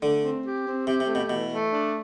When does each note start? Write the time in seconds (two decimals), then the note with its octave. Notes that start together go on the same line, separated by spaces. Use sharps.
0.01 D3 A3
0.23 C4
0.45 G4
0.66 C4
0.87 C3 G4
1.00 C3
1.08 A3
1.15 B2
1.28 B2 E3
1.50 A3
1.71 D4